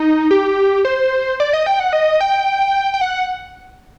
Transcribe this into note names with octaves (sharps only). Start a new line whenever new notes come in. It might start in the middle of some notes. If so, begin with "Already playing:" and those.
Already playing: D#4
G4
C5
D5
D#5
G5
F#5
D#5
G5
G5
F#5